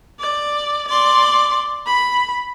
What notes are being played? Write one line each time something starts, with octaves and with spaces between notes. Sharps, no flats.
D5
D5 C6
B5